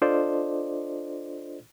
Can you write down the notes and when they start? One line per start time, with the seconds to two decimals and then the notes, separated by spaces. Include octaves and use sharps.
0.02 D4 F4 A4 C5 D5 D#5